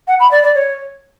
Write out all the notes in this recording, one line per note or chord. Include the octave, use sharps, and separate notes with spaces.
F#5
B5
D5
D5
C#5